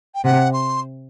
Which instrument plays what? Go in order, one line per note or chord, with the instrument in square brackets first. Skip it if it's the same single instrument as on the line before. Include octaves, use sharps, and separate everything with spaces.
[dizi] G5
[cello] C3 [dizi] F#5
[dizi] C6